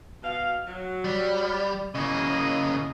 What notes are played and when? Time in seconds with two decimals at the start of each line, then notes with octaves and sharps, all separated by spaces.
0.23 B2 F5
0.67 F#3
1.05 G3
1.95 C#3 A#3 E4 G#4 D#5